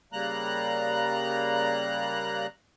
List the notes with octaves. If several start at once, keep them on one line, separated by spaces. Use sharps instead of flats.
C#3 G3 A#3 A#5 F#6